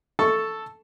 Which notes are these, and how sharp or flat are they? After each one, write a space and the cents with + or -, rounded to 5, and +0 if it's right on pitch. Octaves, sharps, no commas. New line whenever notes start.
A4 +0 A5 +0 C#6 +0